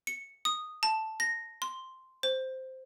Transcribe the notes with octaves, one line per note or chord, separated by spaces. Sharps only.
C#7
D#6
A5
A#6
C6
C5